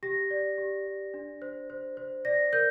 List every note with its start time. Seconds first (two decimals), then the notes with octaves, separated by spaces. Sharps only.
0.03 G4 A#6
0.31 D5
0.58 G4
0.87 D5
1.14 D4
1.42 C5
1.70 C5
1.97 C5
2.25 D5 A#6
2.53 A#4 G6